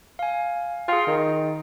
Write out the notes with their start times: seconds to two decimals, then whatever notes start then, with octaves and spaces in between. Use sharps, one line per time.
0.19 F5 G#5
0.88 F4 G#4 G5
1.07 D#3